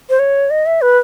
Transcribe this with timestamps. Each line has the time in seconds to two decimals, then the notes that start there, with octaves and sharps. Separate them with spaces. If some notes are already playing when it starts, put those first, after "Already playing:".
0.10 C5
0.19 C#5
0.50 D#5
0.66 E5
0.82 B4